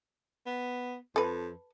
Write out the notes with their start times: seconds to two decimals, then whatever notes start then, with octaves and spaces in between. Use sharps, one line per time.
0.46 B3
1.16 F2 A4 B4